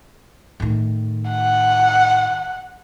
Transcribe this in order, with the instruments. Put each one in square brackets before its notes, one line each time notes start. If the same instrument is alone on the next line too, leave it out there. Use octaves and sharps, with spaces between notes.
[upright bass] A2 D#3
[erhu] F#5